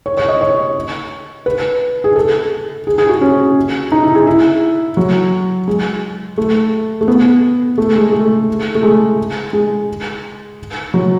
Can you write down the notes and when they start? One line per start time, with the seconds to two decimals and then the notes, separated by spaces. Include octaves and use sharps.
0.06 C#5
0.17 C#5
0.29 D#5
0.41 C#5
1.46 B4
2.04 G#4
2.16 A4
2.87 G#4
2.98 G#4
3.09 F#4
3.21 C#4
3.92 D#4
4.03 E4
4.15 G#4
4.27 E4
4.97 F#3
5.68 G#3
6.38 A3
7.01 A3
7.08 B3
7.78 A3
7.96 G#3
8.12 A3
8.75 A3
8.83 G#3
9.53 G#3
10.94 F#3